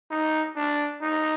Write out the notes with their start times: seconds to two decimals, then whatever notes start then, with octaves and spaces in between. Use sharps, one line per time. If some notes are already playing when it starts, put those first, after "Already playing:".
0.11 D#4
0.56 D4
1.02 D#4